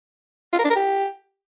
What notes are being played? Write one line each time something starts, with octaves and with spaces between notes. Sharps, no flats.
F4
A#4
D4
A#4
G4